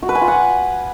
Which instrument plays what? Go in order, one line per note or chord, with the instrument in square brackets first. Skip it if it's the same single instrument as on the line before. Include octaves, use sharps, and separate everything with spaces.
[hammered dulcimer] F#4
B4
G#5
F4
F#5